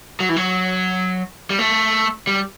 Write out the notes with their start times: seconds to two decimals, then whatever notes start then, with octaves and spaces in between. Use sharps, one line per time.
0.20 F#3
0.29 E3
0.36 F#3
1.50 G3
1.59 A3
2.27 G3